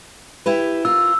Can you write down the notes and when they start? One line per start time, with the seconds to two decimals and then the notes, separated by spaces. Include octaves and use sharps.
0.46 E4 G4 B4
0.85 F4 A#4 E6